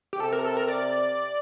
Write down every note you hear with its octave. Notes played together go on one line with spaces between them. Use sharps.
G4
C3 A4
A#4
A4
A#4
D5